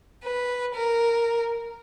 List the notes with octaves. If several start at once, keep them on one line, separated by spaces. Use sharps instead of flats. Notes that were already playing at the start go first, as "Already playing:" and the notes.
B4
A#4